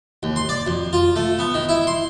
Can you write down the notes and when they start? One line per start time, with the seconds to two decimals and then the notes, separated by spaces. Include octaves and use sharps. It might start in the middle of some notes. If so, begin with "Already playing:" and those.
0.23 D#2
0.36 C6
0.49 D5
0.67 F2
0.93 F4
1.16 A3
1.39 B3
1.54 D#3
1.69 E4
1.87 C6